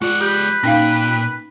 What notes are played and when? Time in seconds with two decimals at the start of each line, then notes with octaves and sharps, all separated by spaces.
0.02 G#3 F4 D5 F#5
0.21 G4 B4 G6
0.63 A#2 C#4 D#4 F5 G5